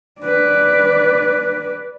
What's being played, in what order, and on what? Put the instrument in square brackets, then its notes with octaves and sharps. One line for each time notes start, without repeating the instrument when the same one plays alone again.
[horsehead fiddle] B4 D5